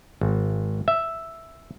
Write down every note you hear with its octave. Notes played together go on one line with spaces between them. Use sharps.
G#1
E5